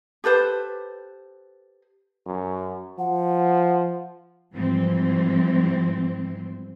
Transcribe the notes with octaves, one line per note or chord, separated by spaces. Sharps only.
G4 A4 B4 C5
F#2
F3 F#5
G#2 E3 F3 G3 C4